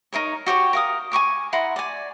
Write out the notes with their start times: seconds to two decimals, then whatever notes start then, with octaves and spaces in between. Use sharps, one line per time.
0.13 D#4 F4 A#4 C#5
0.46 F#4 G4 C#5 C#6
0.73 A#4 F5 D#6
1.12 G#5 A#5 C#6 D6
1.53 E4 F#5 A#5 C6
1.76 D5 G#5